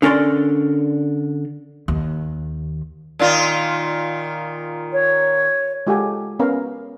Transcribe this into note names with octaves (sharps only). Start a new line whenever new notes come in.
D3 C#4 A#4 D5 C6
D#2
A#2 D#3 F4
C#5
G#3 F4 G4 A4 F#5 G#5
B3 C#4 A#4 B4 F5 A#5